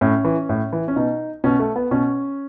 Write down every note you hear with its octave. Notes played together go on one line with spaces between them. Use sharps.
A2 C#4
E3
A2
E3
C#4
B2 D#4
B2 C#4
A3
B3
B2 C#4